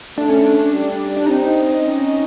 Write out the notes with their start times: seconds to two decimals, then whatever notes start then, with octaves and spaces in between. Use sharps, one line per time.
0.17 A3 D4
0.29 C#4
0.42 D4
0.72 G3
1.17 D4
1.26 C4 D#4
1.82 C#4